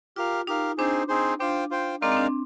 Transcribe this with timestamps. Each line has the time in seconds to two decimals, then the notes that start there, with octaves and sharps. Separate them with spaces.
0.16 F4 G4 A#4 F5
0.47 D#4 G4 A#4 F5
0.78 C4 D4 D#4 G#4 C5
1.08 C4 D#4 G#4 C5
1.40 D4 F4 C5 G5
1.71 F4 C5 G5
2.02 G#3 C4 D#4 A#4 D5 F5
2.12 C4
2.17 D4